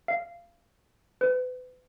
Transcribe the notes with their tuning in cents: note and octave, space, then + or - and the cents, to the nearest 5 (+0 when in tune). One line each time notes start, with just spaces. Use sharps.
F5 -20
B4 +35